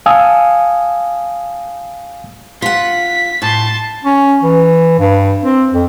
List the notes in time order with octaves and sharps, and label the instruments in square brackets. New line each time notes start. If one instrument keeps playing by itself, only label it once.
[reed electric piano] F5 G#5 A5 D#6 E6
[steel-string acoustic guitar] F4 F#5 [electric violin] B6
[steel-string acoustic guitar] A2 [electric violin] A5 C6
[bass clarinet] C#4
E3
G2
C4
F2